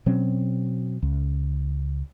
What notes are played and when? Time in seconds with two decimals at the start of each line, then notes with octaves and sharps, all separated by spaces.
0.06 B2 F#3 C4 C#4
1.03 C#2